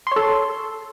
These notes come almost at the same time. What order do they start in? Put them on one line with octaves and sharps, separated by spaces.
C6 C#5 A4